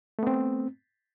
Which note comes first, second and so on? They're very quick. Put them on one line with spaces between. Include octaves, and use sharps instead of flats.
A3 B3 C4